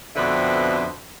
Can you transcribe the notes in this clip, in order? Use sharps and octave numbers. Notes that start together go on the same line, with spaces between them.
F2 B2 D3 C4 B4 E5